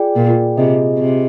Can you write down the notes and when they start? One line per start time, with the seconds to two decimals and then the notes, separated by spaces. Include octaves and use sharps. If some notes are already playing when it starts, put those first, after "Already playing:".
Already playing: F4 G#4 D5 G5
0.16 A#2
0.57 C3 F4 G#4 D#5
0.98 C3